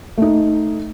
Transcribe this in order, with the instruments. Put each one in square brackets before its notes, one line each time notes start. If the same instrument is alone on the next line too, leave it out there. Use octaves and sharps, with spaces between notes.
[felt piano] A3 D#4